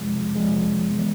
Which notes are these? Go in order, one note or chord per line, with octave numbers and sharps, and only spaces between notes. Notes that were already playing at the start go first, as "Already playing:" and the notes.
Already playing: F2 C3 F3 G#3
F2 C3 F3 G#3
E3 G#3 B3